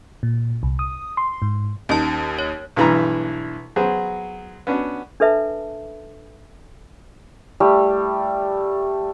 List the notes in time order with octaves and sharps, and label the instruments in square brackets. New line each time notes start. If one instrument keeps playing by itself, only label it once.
[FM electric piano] A#2
C2
D#6
C6
G#2
[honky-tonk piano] D#2 D#4 [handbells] C#4 A5
[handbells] C#5
[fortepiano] B1 G2 E3 E4 A#5
F#3 B3 G#4 C5
B3 C#4 D4 F#4
[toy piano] D4 A4 B4 E5 A5
[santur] G3 A3